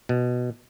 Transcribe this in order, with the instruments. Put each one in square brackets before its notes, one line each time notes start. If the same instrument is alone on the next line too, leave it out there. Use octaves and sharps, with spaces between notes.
[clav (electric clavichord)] B2